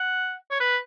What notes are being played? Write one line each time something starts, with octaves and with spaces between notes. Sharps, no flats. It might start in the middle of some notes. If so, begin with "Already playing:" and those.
Already playing: F#5
C#5
B4